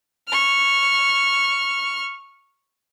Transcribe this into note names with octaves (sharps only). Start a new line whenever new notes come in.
C#6 F6